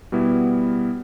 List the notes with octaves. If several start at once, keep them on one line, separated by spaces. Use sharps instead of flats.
B2 G3 B3 E4